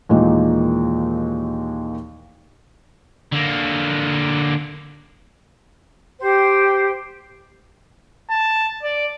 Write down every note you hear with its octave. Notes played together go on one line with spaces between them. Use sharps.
D#2 A#2 D#3 E3 G#3 A#3
D3 A#3
G4 C5 G5
A5
D5